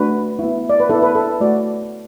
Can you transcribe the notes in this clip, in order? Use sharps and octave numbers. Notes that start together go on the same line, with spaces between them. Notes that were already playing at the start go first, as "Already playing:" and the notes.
Already playing: A3 D4 F#4 B4
B3 E4
D5
B4
B3 E4 A4
B4
A4
A3 F#4 D5